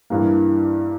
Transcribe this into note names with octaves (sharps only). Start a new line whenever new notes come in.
G2 E3 G3 A#3